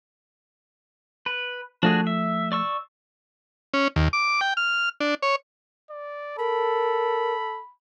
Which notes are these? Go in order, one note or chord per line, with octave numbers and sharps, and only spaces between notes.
B4
F3 A3 D4 F#4 G#4
E5
D5 C#6 E6
C#4
D#2
D6
G5
F6
D4
C#5
D5
A4 A#4 B5